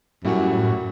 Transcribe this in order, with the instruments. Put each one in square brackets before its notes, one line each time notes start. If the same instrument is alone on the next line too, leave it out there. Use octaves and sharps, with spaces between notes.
[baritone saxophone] F#2 [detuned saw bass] A2 [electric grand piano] G3 E4 F#4